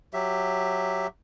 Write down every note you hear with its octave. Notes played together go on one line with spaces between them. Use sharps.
F#3 G4 E5